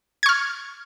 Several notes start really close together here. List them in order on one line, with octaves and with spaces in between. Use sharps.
G#6 C#6 F6